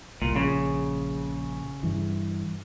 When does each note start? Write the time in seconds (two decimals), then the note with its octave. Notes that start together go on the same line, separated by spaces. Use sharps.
0.22 C2 A#2
0.36 A#1 C#3
1.83 G2 E3